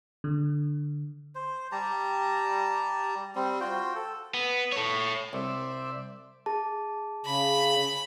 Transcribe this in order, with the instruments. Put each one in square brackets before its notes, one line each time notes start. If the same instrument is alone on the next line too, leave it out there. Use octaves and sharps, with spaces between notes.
[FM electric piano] D3
[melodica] C5
G3 G4 A5 A#5
G3 C4
F4 F#4 C5 G5
A4
[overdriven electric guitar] B3
A4 C#5
[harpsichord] C2 [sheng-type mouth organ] C5 D5 E5
[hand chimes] G#4 A5
[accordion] C#3 [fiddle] B5